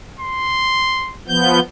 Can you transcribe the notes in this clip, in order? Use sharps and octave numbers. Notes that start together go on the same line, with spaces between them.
C6
F3 B3 G6